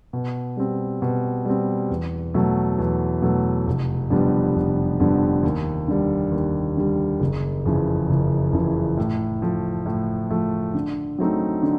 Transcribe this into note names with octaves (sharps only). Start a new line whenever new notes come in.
B2
G3 C4
B2
G3 C4
E2
B2 F#3 A3
E2
B2 F#3 A3
F1
F2 D3 G3 B3
F1
F2 D3 G3 B3
D#2
D3 G3
D#2
D3 G3
F#1
F2 C#3 E3
F#1
F2 C#3 E3
A2
F3 A3
A2
F3 A3
D3
F#3 A3 C4 D#4
D3